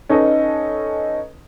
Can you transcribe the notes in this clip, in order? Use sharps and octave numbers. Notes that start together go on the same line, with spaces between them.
C#4 D#4 A4 B4 D#5